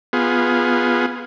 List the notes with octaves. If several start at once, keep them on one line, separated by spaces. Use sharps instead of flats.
B3 F4 G#4